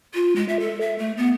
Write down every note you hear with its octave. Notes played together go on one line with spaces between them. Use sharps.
F4
G#3
E5
A4
E5
A3
B3